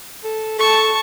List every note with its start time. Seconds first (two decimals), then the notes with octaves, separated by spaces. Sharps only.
0.24 A4
0.59 A4 A5 C#6